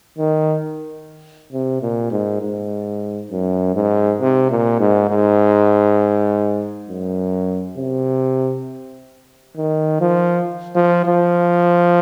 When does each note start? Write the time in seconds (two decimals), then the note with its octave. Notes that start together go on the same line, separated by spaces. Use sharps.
0.18 D#3
1.52 C3
1.82 A#2
2.12 G#2
2.41 G#2
3.31 F#2
3.75 G#2
4.21 C3
4.50 A#2
4.80 G#2
5.10 G#2
6.88 F#2
7.77 C3
9.56 D#3
10.01 F3
10.75 F3
11.06 F3